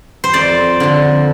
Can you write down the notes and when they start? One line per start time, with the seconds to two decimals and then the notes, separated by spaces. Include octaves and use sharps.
0.24 C5
0.34 F2 D5
0.80 D3 F3